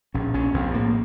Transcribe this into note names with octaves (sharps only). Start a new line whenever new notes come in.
A#1 C#4
A#1 C#4
A#1 C4
A2 A#3